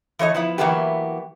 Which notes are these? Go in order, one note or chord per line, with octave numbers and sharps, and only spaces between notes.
E3 A3 C#5 D#5
F3 B3 E4
E3 F#3 A#3 B3 E4 G4